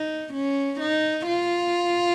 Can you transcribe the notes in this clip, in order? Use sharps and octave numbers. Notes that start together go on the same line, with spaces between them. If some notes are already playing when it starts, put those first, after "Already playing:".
Already playing: D#4
C#4
D#4
F4